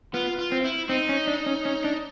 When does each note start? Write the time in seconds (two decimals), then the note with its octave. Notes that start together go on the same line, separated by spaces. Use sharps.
0.14 B3 F4
0.39 F4
0.52 C4
0.64 E4
0.89 C4 D#4
1.09 C#4
1.27 D4
1.46 C#4
1.65 C#4
1.84 D4